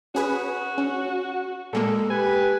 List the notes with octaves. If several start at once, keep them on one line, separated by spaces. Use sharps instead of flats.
C#4 F#4 G#4 B4
C#4
A#2 G#3 A#3 A4
G4 B4 G#5